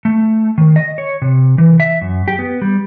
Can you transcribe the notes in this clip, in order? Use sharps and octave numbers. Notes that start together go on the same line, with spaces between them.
A3
D#3
D#5
C#5
C3
E3
E5
F#2
G4
B3
G3